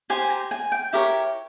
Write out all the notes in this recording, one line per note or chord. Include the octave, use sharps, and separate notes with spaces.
G4 C5 G#5
A#5
G#5
G5
E4 G4 A#4 C#5